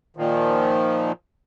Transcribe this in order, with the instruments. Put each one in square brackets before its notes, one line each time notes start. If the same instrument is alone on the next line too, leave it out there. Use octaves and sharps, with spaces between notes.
[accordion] A#2 D#3 F3